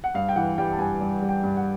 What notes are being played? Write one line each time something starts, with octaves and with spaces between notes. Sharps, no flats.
F#5
G2 F5
G5
E3 F#5
G3 G5
A5
G2 G#5
G2
G3
G5
G2
F#5